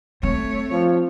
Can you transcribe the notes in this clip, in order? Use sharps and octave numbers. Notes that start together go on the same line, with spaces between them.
A3 C4 C#5
F3